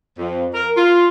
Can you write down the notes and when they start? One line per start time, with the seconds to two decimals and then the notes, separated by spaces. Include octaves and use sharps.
0.18 F2
0.54 A#4
0.77 F4